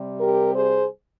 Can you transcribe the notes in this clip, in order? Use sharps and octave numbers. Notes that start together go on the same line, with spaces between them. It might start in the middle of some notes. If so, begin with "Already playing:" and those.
Already playing: C3 G3 C4
G4 A#4
G#4 C5